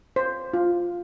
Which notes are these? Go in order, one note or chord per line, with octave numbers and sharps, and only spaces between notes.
C5
F4